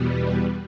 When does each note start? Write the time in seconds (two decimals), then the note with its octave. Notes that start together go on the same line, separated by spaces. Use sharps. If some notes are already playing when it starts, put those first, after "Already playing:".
Already playing: E2 B2 G3 B3